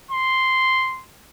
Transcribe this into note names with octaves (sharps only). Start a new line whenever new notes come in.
C6